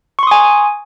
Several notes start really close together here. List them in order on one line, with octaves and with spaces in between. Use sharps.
C#6 C6 D#6 G#5